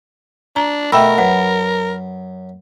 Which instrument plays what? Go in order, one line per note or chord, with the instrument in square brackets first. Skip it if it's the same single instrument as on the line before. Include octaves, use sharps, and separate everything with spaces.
[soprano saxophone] D4 [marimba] A#5
[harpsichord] B2 A3 [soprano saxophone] A#4 [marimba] E5 G5 E6 [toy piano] B5
[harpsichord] F#2 [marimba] B4 [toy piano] F#5